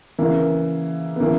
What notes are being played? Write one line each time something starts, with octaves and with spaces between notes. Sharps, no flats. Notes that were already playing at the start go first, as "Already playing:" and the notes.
C#3 E3 A#3
B3
C#3 E3 A#3